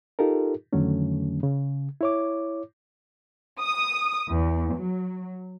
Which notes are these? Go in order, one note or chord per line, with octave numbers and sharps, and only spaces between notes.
D#4 F4 G4 A4 A#4
F2 D3 D#3 F#3 A3 C#4
C#3
E4 C#5 D6
D#6
E2
F#3